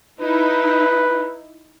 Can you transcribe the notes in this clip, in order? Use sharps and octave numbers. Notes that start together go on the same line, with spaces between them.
D#4 E4 B4